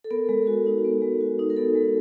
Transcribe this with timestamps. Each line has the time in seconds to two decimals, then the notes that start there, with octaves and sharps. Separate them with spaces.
0.04 A4
0.11 B3 A#4
0.29 G#3
0.47 F#4
0.66 D#4
0.85 B3
1.02 G#3
1.21 F#4
1.39 D#4
1.50 A#4
1.57 B3 A4
1.75 G#3